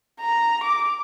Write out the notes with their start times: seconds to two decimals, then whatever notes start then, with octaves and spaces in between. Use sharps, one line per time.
0.20 A#5
0.64 D6